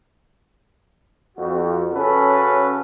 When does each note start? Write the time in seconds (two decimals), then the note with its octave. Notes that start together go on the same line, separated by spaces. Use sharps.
1.37 F2 F#4
1.93 C#3 C#4 F#4 A4 B4